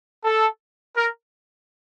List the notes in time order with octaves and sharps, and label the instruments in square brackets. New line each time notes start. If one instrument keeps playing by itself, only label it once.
[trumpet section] A4
A#4